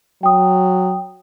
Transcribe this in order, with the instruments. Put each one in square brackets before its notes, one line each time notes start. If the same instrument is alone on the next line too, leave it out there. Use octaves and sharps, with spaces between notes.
[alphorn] F#3 [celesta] G5 D#6